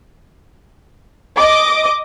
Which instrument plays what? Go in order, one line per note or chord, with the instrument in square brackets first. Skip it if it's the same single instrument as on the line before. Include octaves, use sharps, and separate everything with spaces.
[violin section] D#5 D6